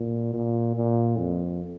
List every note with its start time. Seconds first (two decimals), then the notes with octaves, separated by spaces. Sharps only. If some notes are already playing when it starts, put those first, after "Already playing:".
Already playing: A#2
0.33 A#2
0.75 A#2
1.17 F2